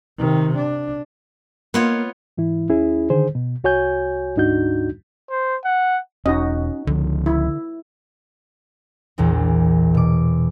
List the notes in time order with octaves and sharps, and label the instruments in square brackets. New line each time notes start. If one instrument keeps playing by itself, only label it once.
[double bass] C3 D#3
D4
[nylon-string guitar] A#3 [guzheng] B3 F4 C#5
[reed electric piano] G#2 E3 E4
D#2 C#4 E4 G#4
D3 D#3 G#4 C5
B2
C2 F#4 C#5 G#5 G6
D2 G#2 D4 D#4 F#4 G6
[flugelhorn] C5
F#5
[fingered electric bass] E1 [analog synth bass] C#4 [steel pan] D#4 F#4 D#5
[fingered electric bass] C#2 F3 [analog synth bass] D3
[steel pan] E4
[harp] E1 A#1 E2
B2 D6